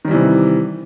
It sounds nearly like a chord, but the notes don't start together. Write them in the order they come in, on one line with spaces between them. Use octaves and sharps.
D#3 G3 E3 C3